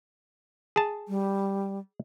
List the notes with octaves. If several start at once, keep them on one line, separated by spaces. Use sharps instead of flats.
G#4 A5
G3